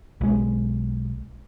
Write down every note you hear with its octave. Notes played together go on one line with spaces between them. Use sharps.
B1 G#3